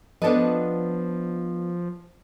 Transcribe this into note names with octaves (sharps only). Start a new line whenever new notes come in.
F3 B3 D4 A4 B4 D#5